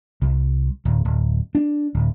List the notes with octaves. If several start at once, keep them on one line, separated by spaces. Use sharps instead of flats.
C2
D1
D1
D4
D1